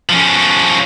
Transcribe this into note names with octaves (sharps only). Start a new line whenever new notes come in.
F3 C#4